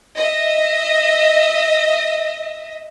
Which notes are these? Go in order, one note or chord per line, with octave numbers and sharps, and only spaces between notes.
D#5 E5